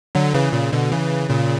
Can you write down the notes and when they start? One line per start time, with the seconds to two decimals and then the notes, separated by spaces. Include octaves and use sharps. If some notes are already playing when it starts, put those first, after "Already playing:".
0.15 D3 F#3
0.34 C#3 E3
0.52 A#2 C#3
0.72 B2 D3
0.92 C#3 E3
1.29 A#2 C#3